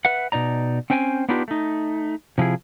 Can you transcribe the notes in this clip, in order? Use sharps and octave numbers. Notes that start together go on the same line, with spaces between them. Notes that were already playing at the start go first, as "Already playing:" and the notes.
B4 E5 F#5
B2 D#4 D5 A#5
C4 C#4 C5 G5 G#5
B3 D4 D#4 F4 G4 B4
A3 D#4
C3 F3 E4 G#4